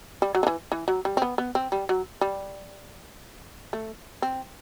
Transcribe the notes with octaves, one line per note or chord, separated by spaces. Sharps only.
G3
F#3
D3
E3
E3
F#3
G3
C4
B3
B3
C4
G3
F#3
G3
A3
C4